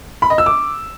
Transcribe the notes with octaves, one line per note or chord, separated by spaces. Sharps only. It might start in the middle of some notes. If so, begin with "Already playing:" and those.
B5
D#5
E6
D6